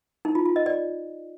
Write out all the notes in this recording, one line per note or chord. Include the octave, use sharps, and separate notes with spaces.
D#4
F4
F4
D#5
D5